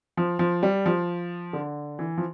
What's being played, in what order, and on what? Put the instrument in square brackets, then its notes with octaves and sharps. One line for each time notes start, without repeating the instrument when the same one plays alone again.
[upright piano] F3
F3
G3
F3
D3
E3
F3